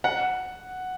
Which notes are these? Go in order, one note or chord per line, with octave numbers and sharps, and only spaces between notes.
F#5